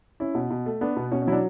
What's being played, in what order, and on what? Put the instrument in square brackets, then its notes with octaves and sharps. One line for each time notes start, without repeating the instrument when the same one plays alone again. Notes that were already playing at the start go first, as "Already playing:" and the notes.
[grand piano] C#4 [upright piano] E4
[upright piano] B2
B2
A3
[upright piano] B3 [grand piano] D4
[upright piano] B2
[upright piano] B2 [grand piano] C#4
[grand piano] C#4
[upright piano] F#3 [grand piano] E4
[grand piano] D4